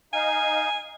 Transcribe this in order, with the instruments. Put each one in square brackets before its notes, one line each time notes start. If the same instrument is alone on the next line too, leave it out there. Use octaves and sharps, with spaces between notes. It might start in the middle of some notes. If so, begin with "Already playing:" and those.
[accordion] D#4 F5 [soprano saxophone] G#5